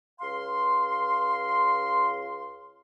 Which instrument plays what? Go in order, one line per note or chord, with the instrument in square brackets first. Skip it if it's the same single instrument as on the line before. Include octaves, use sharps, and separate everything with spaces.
[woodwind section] C#2 F5 C6